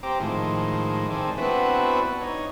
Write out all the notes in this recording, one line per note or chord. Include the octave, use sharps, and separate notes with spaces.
C4 G4 A#5 D6
A2 D#3 F3 G#3
D#3 C4 G#4 A4 D5
B3 C4 D4 E4 F#4 B4
D#4 C#5